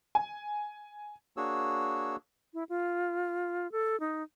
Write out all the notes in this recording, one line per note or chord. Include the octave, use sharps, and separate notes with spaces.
G#5
A#3 D4 F#4 G#4 C#5 E6
E4
F4
A4
D#4